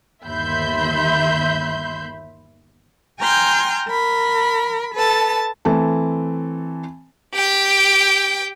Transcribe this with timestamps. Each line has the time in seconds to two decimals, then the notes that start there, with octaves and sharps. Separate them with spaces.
0.25 G1 D#2 E5 B5 C6 G6
3.21 G5 G#5 A#5 C6 F6 G6
3.89 A#4 B5
4.95 A4 B4 A5
5.65 E3 A3 C4 A5
7.34 G4 G5